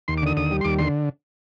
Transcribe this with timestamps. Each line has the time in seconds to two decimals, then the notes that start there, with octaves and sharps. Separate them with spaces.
0.08 D#2 C6
0.18 D6
0.22 D3 D#6
0.37 D#2 D#6
0.51 G3
0.61 C6
0.64 D#2 D6
0.78 D3 C6